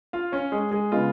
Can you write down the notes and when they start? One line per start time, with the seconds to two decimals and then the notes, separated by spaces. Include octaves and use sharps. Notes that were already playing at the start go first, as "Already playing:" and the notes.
0.13 F4 F5
0.32 C#4 C#5
0.52 G#3 G#4
0.71 G#3 G#4
0.91 C#3 G#3 B3 F4